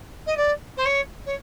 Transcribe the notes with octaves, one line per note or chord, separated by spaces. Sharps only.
D#5
D5
C5
C#5
C#5